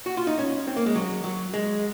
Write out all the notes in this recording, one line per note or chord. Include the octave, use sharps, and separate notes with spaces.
F#4
F4
D#4
C#4
C4
A#3
G#3
F#3
F#3
G#3